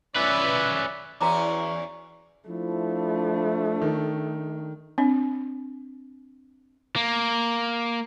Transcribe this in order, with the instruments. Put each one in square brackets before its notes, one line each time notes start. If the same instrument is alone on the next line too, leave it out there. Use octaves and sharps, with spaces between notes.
[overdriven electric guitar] C#4 B4 [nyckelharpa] D5 E5
[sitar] E2 E3 C#4 [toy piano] F#4 A#5 D6
[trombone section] F3 E4 [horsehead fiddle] A3 D4
[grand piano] D#3
[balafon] C4 D4
[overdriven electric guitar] A#3